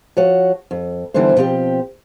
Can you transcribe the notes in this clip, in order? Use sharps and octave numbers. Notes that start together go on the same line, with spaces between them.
F3 F#4 C#5
F2
D3 E3 G3 B3 D4 C5
B2 F3 C4 G4